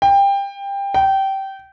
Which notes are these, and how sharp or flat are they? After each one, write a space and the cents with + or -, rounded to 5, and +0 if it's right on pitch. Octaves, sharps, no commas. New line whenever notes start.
G5 +20
G5 -20